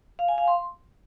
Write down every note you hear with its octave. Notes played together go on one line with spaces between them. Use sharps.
F5
G#5
F5
C6